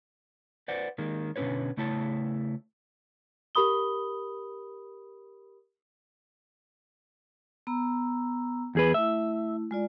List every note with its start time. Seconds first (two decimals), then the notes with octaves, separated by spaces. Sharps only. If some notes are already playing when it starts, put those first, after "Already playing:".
0.68 B4 C5 D5 F#5
0.98 D#3 G#3 A#3
1.36 B2 D3 C#4 G4 B4 C#5
1.77 C#3 A3 E4 C#5 A5
3.55 G4 A#4 B5 D#6 G7
7.67 B3 A#5 E6
8.75 E2 G#4 B4
8.94 A3 E4 E5
9.71 G#3 F4 D5